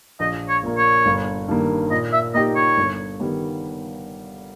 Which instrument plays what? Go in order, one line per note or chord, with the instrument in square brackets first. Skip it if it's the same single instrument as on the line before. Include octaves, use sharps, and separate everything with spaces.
[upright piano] A#1 [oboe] D#5
[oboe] C#5
[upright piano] A#2 A#3
[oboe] C#5
[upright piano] G1
G2 D#3 A#3
[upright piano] A#2 [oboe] D#5
[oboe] E5
[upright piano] A#3 D#4 G4 [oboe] D#5
[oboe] C#5
[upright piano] G1
D#3 G3 B3